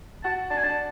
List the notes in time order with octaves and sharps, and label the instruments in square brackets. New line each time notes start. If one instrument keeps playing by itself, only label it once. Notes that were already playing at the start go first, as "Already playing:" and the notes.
[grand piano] F#4 F#5 [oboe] A5
[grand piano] D4 D5 [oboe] A5
[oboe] G#5
[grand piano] D4 D5 [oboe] A5